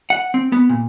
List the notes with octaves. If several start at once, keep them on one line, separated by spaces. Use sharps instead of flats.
F#5
C4
B3
A#2